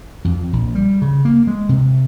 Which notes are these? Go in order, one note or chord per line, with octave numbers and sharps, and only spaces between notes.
F2
A#1
G3
C#3
A#3
G#3
C3